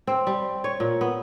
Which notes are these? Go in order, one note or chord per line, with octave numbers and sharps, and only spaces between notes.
C4
G3
C#5
A#2
B3